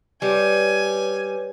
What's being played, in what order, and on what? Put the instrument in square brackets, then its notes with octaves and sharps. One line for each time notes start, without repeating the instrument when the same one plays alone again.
[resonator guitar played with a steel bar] G3 [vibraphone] B4 C#5 [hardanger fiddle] G#5